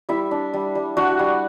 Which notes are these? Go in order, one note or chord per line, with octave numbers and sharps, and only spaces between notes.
G3 E4 E5
D4
G3
G3
D4 F#4 F#5
G3